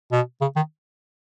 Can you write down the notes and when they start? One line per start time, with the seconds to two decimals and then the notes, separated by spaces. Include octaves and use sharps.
0.12 B2
0.41 C#3
0.56 D#3